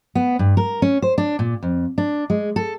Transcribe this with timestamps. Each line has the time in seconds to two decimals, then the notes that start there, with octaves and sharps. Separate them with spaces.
0.15 B3
0.39 G2
0.57 A#4
0.82 C#4
1.02 C5
1.18 D4
1.39 A#2
1.63 F2
1.98 D4
2.30 G#3
2.56 A4